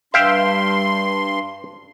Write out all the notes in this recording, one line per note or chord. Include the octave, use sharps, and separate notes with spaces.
G2 E5 F5 G5 C6